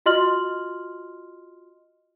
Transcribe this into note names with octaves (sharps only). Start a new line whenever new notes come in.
F4 F#4 D#5 C6 F6 F#7